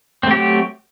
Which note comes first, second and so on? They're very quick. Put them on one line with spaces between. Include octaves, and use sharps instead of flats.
C4 A3 G4 F#3